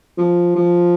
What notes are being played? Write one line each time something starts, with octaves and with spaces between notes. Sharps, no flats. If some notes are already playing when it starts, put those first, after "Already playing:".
F3
F3